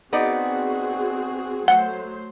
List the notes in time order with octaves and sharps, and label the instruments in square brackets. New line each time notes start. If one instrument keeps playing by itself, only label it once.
[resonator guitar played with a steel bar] B3 D#4 D5 [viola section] C4 F#4 G#4
[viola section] F#3 A3 C5 [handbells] F#5